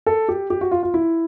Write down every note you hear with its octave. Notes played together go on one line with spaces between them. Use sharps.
A4
G4
G4
F#4
F4
F4
E4